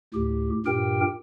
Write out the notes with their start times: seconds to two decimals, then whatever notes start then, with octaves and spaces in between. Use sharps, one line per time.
0.14 D2 A2 G4
0.66 G2 A#2 G4 A#4 G5